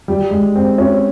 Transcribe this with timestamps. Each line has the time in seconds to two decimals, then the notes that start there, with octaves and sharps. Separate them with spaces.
0.08 G3
0.31 G#3
0.55 C4
0.78 C#4